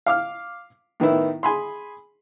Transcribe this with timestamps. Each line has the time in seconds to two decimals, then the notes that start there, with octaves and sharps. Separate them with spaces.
0.06 F5 D6 F6
1.00 A2 D#3 B3 E4
1.43 G#4 G#5 B5 C6